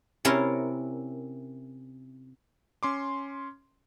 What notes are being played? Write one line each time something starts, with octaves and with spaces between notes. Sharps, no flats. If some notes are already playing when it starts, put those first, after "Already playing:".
C3 C#4 E4 A#4 A5 C6
C#4 C6 D6